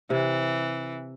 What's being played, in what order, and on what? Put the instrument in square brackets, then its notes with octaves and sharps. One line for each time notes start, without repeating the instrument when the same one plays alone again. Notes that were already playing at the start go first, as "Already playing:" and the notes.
[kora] C3 [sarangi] E3